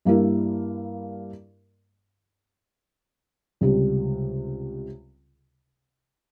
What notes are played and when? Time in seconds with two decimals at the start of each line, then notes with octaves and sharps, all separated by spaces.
0.05 G2 G3 A#3 E4 A#4
3.61 C#2 C3 G3